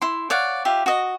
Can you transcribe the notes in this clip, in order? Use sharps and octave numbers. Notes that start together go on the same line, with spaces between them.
E4 C6
C#5 D5 F5 F#5
F4 G4 E5
F#4 D#5